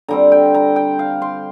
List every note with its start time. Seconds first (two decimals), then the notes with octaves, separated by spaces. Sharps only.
0.08 D3 G3 C4 A#5
0.32 G5
0.54 A#5
0.76 G5
0.99 F5
1.22 C6